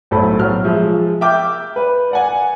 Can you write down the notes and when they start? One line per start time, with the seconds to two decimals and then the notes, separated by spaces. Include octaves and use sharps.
0.11 B1 A2 F#3 A4 C5 B5
0.38 B2 F#3 F6
0.64 F3 G#3 E5
1.21 E5 G5 D6 F6 G6
1.76 B4
2.11 D5 F#5 G#5